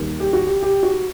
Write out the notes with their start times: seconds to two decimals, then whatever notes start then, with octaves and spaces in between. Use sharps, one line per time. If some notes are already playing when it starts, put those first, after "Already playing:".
Already playing: D#2 D#3 G3
0.20 G4
0.33 F#4
0.47 G4
0.63 G4
0.83 F#4